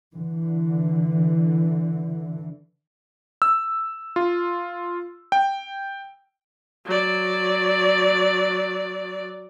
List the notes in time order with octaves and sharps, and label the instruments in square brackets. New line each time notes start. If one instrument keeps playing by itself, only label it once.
[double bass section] D3 E3
[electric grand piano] E6
F4
G5
[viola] F#3 D5